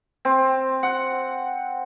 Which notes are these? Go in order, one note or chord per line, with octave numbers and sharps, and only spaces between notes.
C4
F#5